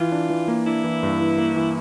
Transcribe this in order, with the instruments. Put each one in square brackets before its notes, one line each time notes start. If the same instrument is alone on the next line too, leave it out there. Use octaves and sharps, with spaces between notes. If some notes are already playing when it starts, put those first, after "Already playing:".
Already playing: [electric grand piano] E3 [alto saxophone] F4
[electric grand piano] D4
E3
A#3
[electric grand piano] D4 [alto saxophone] E4
[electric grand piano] E3
G2
E3
A#3
E3